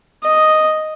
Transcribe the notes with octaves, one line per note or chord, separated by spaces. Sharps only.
D#5